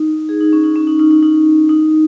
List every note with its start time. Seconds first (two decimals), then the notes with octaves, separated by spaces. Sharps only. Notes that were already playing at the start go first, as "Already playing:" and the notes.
Already playing: D#4
0.29 G#4
0.41 D#4
0.53 C#4
0.64 D#4
0.76 C#4
0.87 D#4
1.00 D#4
1.11 D#4
1.23 D#4
1.69 D#4